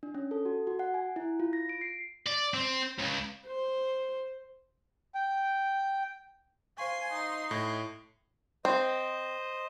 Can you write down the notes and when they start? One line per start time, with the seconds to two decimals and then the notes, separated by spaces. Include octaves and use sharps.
0.03 D4
0.15 C#4
0.31 A4
0.45 F#4
0.67 F#4
0.79 F#5
0.94 G#5
1.16 E4
1.40 F4
1.53 A#6
1.69 D7
1.81 C7
2.26 D5
2.54 C4
2.99 C#2
3.46 C5
5.15 G5
6.78 C5 F5 G#5 C6 C#6
7.12 D#4
7.51 A2 G#6 A#6
8.65 C4 C5 D#5